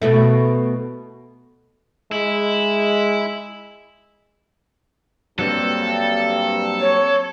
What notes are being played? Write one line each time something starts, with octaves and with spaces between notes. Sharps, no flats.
B2 A3 E4
G#3 E4
G2 F#3 A#3 C4 A4
C#5